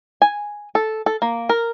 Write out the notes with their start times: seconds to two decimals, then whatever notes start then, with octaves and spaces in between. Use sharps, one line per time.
0.22 G#5
0.75 A4
1.06 A4
1.22 A#3
1.49 A#4